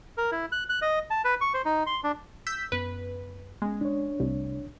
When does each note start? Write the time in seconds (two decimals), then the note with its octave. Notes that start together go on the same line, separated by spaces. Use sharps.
0.18 A#4
0.32 E4
0.52 F#6
0.70 F#6
0.82 D#5
1.10 A5
1.25 B4
1.41 C#6
1.54 C5
1.65 D#4
1.86 C6
2.04 D4
2.47 E6 G6 B6
2.72 F#2 B3 B4
3.62 G#3 B3 C#4
3.81 D4 C#5
4.20 C2 C3 G3 A3